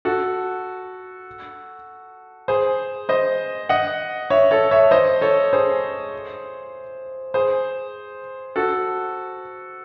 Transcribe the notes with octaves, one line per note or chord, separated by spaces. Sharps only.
F#4 A4
G#4 C5
C5 D#5
D#5 F#5
C#5 E5
A4 C#5
C#5 E5
C5 D#5
A4 C#5
G#4 C5
G#4 C5
F#4 A4